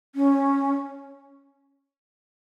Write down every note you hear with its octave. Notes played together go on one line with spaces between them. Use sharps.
C#4